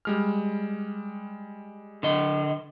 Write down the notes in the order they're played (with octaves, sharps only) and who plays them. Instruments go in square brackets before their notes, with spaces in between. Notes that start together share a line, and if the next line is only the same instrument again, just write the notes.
[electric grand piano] G3 G#3 F6
[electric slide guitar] D3 D#5